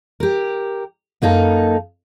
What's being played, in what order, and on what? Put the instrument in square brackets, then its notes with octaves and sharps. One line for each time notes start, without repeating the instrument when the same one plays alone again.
[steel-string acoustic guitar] G4 A#4
F#2 A#3 D#4 A4